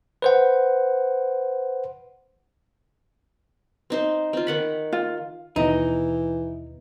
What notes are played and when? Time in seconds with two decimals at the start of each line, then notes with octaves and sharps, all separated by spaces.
0.22 B4 C5 F#5
3.90 C4 D#4 C5
4.33 C4 F4
4.47 D#3 F#5 B5
4.93 F4
5.56 D#2 B2 D#3 E3 D#4